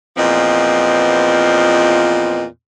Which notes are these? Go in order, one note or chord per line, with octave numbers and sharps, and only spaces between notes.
E2 A#2 F3 B3 C4 D#5